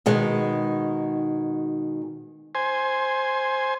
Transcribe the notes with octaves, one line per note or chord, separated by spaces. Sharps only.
B2 D#3 G#3
C5 G#5